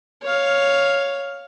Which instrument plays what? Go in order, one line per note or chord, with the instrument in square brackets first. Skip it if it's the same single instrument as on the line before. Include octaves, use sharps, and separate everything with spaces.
[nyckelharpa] C#5 F5